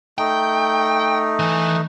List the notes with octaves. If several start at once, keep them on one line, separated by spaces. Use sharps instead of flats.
A3 D#4 G5
E3